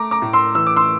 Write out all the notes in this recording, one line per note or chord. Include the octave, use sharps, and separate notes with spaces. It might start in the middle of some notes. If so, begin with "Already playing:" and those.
Already playing: A3 A#5 D6
A#5 D6
A2
C6 E6
E3 E6
D6
C6 E6